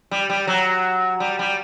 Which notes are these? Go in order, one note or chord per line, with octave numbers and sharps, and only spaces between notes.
G3
G3
F#3
G3
G3